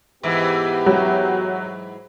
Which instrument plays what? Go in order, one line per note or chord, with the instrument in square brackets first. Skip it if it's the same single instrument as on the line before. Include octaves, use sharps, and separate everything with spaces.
[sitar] G#2 E3 [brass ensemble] B3 E4 G4
[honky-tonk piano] F#3